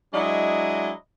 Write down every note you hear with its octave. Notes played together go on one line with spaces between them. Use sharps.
F#3 G#3 D4 E4 D#5